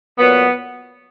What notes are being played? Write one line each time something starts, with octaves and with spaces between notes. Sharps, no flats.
A#2 F#3 B3